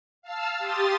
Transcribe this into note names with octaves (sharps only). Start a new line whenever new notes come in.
F5 A5 E6 F6
G4 C6 D#6 A6